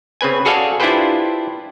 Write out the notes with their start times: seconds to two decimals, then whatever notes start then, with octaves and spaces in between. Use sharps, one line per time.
0.21 C#3 C4 B4 G#5
0.45 F#4 G#4 A4 D5 F5 G#5
0.80 D4 E4 F4 G4 B4 C5